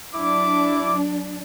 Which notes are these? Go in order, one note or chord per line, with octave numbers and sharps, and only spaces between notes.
F#3 D4 E4 D6